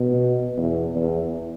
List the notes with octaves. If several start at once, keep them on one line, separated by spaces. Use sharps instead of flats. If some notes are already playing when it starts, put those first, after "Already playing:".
Already playing: B2
E2
E2